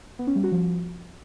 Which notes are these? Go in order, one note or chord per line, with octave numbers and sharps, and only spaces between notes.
B3
C#4
G3
F#4
F3